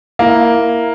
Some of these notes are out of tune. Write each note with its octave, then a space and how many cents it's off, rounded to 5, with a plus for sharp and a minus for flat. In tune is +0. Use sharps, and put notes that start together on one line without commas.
A#3 +0 E4 +0